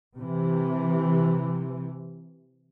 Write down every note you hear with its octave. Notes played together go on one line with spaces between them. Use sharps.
C3 E3